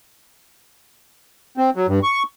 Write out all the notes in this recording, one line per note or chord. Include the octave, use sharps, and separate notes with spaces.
C4
F#3
G2
C#6